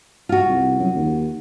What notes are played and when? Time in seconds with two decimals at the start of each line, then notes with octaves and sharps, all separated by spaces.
0.29 F4 F#4
0.49 C2
0.79 F#2
0.95 D#2